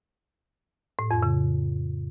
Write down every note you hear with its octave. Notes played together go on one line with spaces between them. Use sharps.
A2
F2
C#3